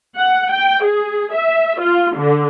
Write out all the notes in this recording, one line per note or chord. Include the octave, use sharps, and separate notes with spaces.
F#5
G5
G#4
E5
F4
D3